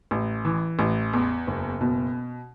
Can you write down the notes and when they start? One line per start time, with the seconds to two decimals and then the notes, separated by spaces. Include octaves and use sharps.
0.11 A1
0.45 E3
0.79 A1
1.13 E2
1.47 F#1
1.81 B2